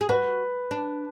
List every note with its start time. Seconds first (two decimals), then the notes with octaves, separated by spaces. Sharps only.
0.01 G#4
0.09 F#4 B4
0.71 D4